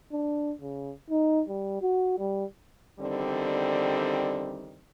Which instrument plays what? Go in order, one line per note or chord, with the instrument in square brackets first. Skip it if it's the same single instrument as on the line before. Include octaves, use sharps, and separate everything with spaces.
[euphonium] D4
C#3
D#4
G3
F#4
G3
[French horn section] E2 D3 D#3 G3 C4